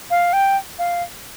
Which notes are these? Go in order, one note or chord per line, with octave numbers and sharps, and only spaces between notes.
F5
G5
F5